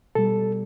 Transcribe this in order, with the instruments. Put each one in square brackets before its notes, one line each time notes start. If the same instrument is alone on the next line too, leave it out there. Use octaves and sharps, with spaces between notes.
[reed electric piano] B2 G3 A4